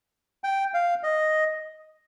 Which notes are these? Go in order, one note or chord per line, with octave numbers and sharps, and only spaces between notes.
G5
F5
D#5